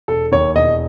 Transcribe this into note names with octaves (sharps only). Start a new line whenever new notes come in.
E1 A4
D#2 C#5
E1 D#5